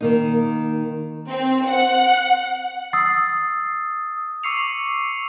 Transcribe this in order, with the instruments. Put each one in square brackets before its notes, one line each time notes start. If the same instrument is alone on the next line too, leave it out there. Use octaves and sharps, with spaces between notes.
[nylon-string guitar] D#3 A#3 D#4
[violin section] C4
F#5
[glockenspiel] D#6 E6 A6 C7
[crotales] C#6 D6 E6 C7 C#7 F7